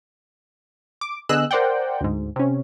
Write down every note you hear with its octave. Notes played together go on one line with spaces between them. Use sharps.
D6
D3 B3 G#4 D#5 E6 F#6
A#4 C5 D5 F#5 G5
D2 G#2
C3 C#4